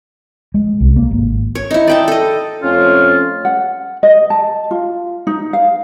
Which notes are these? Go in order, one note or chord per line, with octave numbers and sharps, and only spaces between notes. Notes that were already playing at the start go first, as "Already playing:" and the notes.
G#3
C2
A#3
G#1
C#5
D#4 E4
D5 G5 A5
A4 D#5
F2 A3 C#4 F4
F#5
D#5
A5
F4
D#4
F5